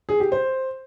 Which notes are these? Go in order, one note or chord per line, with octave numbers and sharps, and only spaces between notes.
G#4
G4
C5